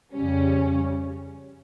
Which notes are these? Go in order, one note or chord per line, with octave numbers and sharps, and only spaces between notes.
F2 C#3 G3 C#4